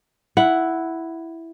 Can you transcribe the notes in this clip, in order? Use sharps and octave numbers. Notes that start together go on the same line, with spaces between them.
E4 F#5